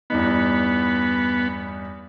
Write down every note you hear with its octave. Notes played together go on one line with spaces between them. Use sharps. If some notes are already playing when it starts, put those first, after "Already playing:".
E2 G2 B3 D#4